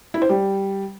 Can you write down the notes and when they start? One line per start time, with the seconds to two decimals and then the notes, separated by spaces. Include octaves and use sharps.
0.14 E4
0.22 C5
0.29 G3